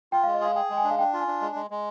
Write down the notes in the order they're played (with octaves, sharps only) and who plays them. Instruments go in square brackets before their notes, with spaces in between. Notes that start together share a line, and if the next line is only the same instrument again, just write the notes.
[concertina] F4 [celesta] G5
[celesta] F5
[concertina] G#3
[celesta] D#5
[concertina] G#4 [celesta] F5
[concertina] G#4 [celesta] G5
[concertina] G#3 [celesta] G5
[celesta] G#5
[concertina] D4
[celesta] F5
[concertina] D4 [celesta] G5
[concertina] F4
[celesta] G#5
[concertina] D4
G#3
G#3
G#3